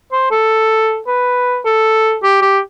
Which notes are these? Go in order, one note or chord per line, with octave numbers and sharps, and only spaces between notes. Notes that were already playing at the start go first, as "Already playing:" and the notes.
C5
A4
B4
A4
G4
G4